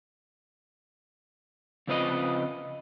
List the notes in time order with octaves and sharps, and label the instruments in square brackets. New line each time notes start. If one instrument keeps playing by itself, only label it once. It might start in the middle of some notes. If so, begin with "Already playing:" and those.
[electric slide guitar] F2 C#3 C4 F4 B4 D#5